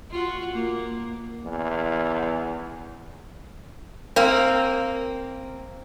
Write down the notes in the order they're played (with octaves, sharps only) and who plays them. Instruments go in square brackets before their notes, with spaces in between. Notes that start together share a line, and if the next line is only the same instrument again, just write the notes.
[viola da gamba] F4 F#4
A#3
[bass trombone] E2
[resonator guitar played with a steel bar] A#3 C4